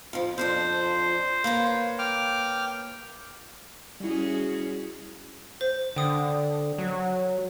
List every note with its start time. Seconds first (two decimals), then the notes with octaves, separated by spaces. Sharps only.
0.13 F2 F3
0.38 F2 F3 D4 C5
1.44 A#3 B4 C#5
1.99 G5 D6 F6
4.00 G3 C#4 E4 F#4 G#4
5.61 C5
5.96 D3 G5 D#6
6.78 F#3